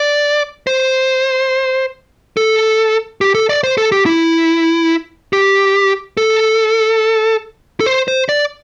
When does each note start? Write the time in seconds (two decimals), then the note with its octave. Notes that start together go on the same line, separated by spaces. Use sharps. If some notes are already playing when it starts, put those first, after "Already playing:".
Already playing: D5
0.67 C5
2.37 A4
3.21 G4
3.35 A4
3.49 D5
3.64 C5
3.78 A4
3.92 G4
4.06 E4
5.33 G4
6.17 A4
7.80 A4
7.86 C5
8.08 C5
8.29 D5